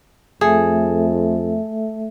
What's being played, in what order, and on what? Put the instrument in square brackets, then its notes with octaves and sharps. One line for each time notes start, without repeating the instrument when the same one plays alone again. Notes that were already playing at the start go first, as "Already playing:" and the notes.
[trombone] F2 [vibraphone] A3 A4 E5 [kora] G#4